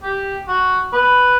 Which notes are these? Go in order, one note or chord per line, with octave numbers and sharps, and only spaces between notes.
G4
F#4
B4